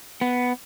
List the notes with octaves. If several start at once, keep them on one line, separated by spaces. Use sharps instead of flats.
B3